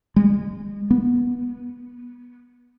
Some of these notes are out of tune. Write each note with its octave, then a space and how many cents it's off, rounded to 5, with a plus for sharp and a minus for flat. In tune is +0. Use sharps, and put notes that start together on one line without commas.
G#3 -40
B3 -20